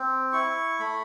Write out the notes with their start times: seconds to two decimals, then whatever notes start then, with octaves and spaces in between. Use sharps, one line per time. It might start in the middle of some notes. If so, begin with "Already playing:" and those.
Already playing: C4
0.32 E4 C#6
0.79 A3 B5